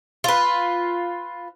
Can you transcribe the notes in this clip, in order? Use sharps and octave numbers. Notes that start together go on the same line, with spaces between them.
F4 B4